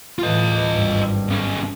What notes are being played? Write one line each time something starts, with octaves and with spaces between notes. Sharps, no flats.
A2 E3 F4 D#5
G#1 G2
B1 C#4